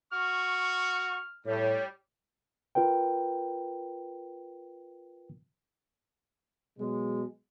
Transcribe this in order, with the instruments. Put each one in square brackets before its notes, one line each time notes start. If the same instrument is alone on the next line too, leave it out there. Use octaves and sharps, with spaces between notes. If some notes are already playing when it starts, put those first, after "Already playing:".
[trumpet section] F#4 C#6 [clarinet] F6
[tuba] A2 [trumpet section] G3 [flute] C#5
[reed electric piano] F4 A#4 B4 G5
[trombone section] B2 F#3 G#3